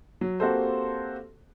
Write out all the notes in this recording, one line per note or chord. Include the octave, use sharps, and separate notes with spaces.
F#3
A#3 C4 F#4 G4 A4 C5